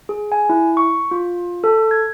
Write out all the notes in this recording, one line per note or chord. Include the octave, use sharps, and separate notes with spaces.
G#4
G#5
E4
C#6
F4
A4
G#6